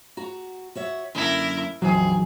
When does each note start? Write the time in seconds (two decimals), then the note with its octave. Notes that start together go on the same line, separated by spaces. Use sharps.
0.17 F#4 A#5
0.75 F#4 C#5 E5
1.15 F#2 D3 A#3 E4 A#4
1.82 A#1 F2 E3 F#3 C4 G#4